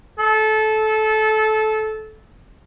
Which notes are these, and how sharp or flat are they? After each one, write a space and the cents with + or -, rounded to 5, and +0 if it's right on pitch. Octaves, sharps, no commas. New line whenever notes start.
A4 -20